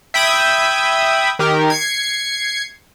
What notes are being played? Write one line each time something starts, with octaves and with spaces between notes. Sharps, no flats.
E5 G5 B5 D#6 G#6
D#3 G4 A#4
G#6 C7 C#7